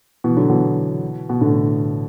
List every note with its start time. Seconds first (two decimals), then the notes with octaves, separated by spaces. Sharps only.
0.24 B2 E3
0.37 D3 F#3
0.50 B2 E3
1.29 B2
1.41 A2 D3